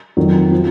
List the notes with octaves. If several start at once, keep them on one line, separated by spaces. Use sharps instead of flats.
F2 D#3 F#3
F3